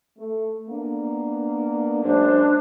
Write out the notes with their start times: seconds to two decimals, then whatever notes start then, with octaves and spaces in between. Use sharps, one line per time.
0.18 A3
0.70 A#3 B3 D4
2.04 F#2 G#3 D4 C5